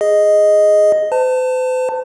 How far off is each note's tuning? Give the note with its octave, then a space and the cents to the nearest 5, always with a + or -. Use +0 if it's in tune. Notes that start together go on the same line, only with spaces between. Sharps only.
G#4 +0 D#5 +0
C5 -45 A5 +20